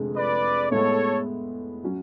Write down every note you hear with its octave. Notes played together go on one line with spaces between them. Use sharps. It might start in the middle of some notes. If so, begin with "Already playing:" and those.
Already playing: F1 F2 D3 G#3
B4 D5
A2 G#3 B3 A4 C#5
F#3 C#4